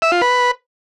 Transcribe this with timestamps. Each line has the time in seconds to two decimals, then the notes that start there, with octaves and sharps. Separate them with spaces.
0.02 E5
0.12 F4
0.22 B4